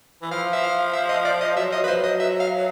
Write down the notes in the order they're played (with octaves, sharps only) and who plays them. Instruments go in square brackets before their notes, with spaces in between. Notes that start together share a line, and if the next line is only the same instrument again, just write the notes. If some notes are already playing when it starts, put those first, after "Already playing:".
[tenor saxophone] E3
[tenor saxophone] F3 [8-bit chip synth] F5
[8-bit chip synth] E5
F5
E5
D#5
D5
D#5
[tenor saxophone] F#3 [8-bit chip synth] E5
[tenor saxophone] F3 [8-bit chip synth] D#5
[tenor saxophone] F#3 [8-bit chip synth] B4
[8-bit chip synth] C5
D#5
E5
F5